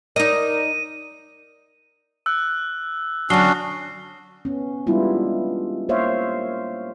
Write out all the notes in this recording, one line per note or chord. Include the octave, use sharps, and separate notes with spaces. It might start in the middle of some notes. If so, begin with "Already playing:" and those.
D#4 A#4 D5 D#5 D#7
E6 F#6
D3 F#3 C#4 D4 F#4 D#6 C7 G7
B3 C#4
G3 G#3 B3 D4 E4 F4
A#3 C5 C#5 E5 F5